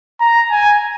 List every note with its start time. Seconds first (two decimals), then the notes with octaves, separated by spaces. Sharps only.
0.20 A#5
0.51 G#5